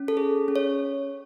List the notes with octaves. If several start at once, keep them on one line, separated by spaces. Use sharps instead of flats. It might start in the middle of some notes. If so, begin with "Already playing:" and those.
Already playing: C#4
A4
G#4
C#4
C#5